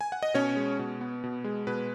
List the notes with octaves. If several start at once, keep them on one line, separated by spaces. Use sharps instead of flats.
G#5
F#5
D#5
B2 C#4 C#5
G#3
B2
B3
B2
G#3
B2 B4